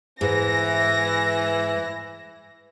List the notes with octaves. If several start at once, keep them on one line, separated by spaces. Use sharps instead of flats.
G#2 E3 A#6